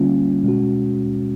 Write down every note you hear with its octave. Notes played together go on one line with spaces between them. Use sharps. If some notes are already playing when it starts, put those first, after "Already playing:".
Already playing: D3 G3 A#3 C#4 F4
B2 G#3 C#4 F#4